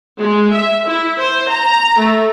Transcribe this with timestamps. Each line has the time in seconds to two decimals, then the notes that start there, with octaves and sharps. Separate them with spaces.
0.18 G#3
0.50 E5
0.86 E4
1.19 C5
1.52 A#5
1.99 A3